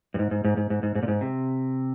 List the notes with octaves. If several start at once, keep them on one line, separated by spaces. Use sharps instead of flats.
G2
G#2
G#2
G#2
G#2
G#2
G#2
G#2
A#2
G#2
C3